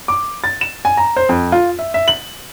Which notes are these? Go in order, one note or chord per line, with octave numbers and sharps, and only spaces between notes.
D6
A6
E7
G#5
A#5
C5
F2
F4
E5
E5
F#7